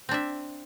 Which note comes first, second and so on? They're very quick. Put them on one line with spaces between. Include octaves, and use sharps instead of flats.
C4 D4 E5